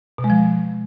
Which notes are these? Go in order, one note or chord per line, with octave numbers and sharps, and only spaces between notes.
B2
G#3
F3